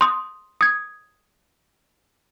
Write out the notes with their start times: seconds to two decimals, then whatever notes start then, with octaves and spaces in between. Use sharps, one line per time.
0.01 C6 D#6
0.61 D#6 G#6